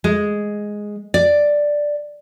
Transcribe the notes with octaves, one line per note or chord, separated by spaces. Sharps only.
G#3
D5